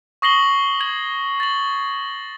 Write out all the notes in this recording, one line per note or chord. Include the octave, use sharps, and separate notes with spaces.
C#6 D#6 A#6 C7 F#7 G7
G#6 F#7
A6 F#7